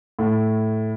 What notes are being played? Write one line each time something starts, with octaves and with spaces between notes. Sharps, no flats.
A2